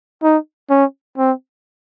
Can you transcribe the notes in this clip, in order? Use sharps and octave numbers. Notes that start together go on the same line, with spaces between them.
D#4
C#4
C4